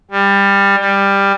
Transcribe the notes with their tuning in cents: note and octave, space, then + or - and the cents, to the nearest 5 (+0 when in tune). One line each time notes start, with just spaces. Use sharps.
G3 +20
G3 +15